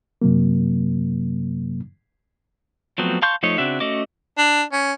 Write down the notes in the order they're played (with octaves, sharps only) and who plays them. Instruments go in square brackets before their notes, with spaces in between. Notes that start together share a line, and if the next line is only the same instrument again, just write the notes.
[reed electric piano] F#2 C3 F#3 A#3
[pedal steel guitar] F3 F#3 A3 B3 C4
F5 A5 C6 C#6 G6
F3 A3 D#4 C#5
C#3 C4 D4 F#4 E5
A3 C#4 F#4 D#5 D6
[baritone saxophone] D4
C#4